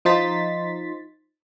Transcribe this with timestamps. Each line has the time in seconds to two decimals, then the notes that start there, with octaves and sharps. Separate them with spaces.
0.05 F3 D#4 C5 C6 A6 B6